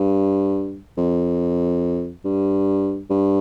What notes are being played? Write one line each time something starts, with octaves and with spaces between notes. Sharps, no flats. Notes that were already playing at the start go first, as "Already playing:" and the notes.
Already playing: G2
F2
G2
G2